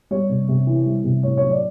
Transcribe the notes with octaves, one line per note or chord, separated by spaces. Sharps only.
G3 C#5
C3
C3
E3
G3
C3
A2 C#5
F#3 C#5
D5